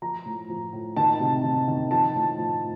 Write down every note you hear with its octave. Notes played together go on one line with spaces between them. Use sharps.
F3 A#5
A2
F3
A2
D#3 A5
C3
D#3
D#3
F3 A5
A2
F3